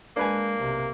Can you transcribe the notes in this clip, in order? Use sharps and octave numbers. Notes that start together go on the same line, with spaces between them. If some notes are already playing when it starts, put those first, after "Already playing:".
G#3 A#3 D4 B4 G#5
B1 C3